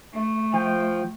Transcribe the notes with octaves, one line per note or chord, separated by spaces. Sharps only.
A3
F3 G5